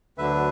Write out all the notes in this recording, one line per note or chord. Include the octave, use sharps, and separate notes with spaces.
D2 D3 F#3 D4 B4 E5